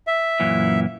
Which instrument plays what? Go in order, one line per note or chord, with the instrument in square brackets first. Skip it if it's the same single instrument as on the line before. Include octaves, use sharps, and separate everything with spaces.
[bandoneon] E5
[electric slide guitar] F#2 A#2 E3